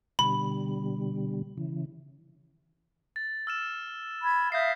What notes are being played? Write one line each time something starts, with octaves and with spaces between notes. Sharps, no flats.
B2 D3 G3 B5
C#3 E3
A6
E6 F6 E7
B5 G#6
E5 F5 D#6 G6 A#6 C7